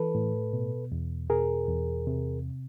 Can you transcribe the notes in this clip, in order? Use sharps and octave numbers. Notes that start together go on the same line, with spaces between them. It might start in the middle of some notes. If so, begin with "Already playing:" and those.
Already playing: E3 A4 B4
A2
B2
E2
B2 G#4 A#4
E2
C3